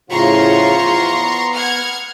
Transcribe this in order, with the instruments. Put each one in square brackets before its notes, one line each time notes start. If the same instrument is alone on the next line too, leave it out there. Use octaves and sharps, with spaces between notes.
[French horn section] E2 F3 F4 [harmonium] A2 C#3 [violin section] A#5 C6 C#6
[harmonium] B3
[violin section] F#5 F6 G#6